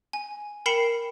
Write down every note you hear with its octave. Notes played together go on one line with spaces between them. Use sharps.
G#5
A#4 G5 B5 C7 C#7 E7